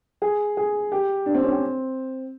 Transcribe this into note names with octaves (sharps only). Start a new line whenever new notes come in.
G#4
G#4
G4
D4
C4
C#4
C4